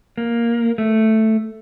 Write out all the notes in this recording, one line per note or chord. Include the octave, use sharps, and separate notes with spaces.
A#3
A3